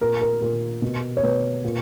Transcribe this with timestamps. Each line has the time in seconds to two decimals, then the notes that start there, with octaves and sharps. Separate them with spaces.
0.01 A#2 A#4
0.21 A#4
0.42 A#2 A#4
0.82 B2
1.17 C#5
1.23 B2 B4
1.64 A#2